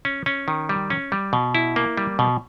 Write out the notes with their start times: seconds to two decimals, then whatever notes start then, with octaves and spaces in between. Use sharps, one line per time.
0.05 C#4
0.26 C#4
0.48 D#3
0.69 G3
0.90 C#4
1.12 G3
1.33 B2
1.55 E4
1.76 A#3
1.97 G3
2.19 B2